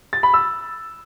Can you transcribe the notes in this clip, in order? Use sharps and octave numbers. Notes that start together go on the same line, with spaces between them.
A6
B5
E6